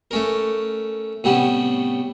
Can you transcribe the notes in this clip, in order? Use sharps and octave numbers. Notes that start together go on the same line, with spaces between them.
A3 C#4 A#4
A2 C3 G3 B3 C#4